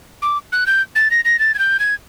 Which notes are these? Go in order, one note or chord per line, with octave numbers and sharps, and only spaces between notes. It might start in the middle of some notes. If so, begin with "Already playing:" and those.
D6
F#6
G6
A6
A#6
A#6
A6
G#6
G6
G#6